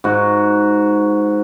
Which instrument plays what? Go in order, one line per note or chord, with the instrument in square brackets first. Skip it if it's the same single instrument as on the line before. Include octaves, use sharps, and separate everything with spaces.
[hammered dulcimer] G#2 F#4